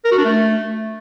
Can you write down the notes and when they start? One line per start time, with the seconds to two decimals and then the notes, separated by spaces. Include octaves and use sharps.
0.05 A#4
0.11 F#4
0.18 D4
0.25 A3